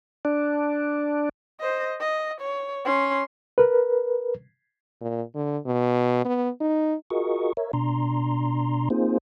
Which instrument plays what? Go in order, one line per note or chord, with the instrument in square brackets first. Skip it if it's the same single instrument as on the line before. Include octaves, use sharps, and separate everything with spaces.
[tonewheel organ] D4
[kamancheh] C5 D#5
D#5
C#5
C#4 C6
[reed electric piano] A#4 B4
[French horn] A#2
D3
B2
B3
D#4
[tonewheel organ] F4 F#4 G#4 A#4 D#5 C#6
A#4 C#5 E5
B2 D4 A#5 C6
A#3 C4 D#4 F4 G#4 C5